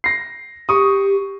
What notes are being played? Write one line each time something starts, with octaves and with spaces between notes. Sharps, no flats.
A#6 C7
G4 C#6 D#6